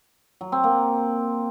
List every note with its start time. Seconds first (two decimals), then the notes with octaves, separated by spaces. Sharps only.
0.41 F#3
0.52 C4
0.64 A#3